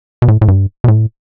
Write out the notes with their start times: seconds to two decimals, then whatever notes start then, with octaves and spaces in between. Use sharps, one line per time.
0.22 B2
0.28 A2
0.41 A2
0.48 G2
0.84 B2
0.88 A2